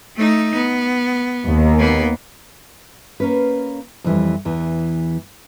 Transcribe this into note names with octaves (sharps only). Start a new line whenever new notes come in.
A3 D#4
B3
D#2
A#3 B3
A#3 C#4 B4
F2 E3 G3
E2 E3